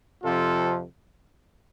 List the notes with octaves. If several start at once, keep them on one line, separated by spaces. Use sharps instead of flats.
F2 C3 F3 F4 A4